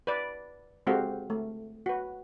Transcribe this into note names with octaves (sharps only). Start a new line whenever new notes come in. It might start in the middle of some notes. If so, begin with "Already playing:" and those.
B4 D5
G#3 C4 F#4 G4 A4 F5
A3
F#4 B4